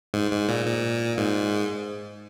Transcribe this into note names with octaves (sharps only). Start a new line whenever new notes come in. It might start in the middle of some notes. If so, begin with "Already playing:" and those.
G#2
G#2
A#2
A#2
G#2